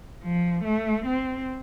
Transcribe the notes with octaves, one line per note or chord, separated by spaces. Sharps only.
F3
A3
C4